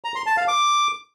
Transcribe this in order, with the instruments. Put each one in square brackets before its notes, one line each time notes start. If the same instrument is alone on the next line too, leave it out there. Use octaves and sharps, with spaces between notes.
[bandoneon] A#5
C6
A5
F5
D6